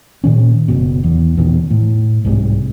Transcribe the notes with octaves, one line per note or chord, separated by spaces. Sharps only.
A#2 D#3 C#4
F#1 B2
E2
E2 B2 D#3
A2
C2 G#2 C3